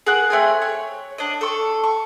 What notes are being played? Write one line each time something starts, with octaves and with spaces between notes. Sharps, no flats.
G#4 A#4 F#5 F#6
A3 C4 G#5
C#5
D4 D#5
A4 C#6
C#6